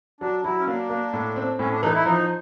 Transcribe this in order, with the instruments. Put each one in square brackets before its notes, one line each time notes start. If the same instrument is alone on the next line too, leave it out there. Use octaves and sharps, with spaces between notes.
[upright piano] F#3 [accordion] D4
[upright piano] F#3 [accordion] E4
[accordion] C#4
[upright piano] A#3 [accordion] D4
[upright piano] A#3
A2
C4
[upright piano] A2 [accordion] C#4
[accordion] D4
[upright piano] E3 [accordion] D#4
[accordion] E4
[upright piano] F3 [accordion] D#4